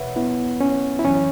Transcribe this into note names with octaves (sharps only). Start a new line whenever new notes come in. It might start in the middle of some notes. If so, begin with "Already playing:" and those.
Already playing: E2 B2 B4 C#5 E5 F#5
B3 E4
C#4
E4
F#2 E3 C#4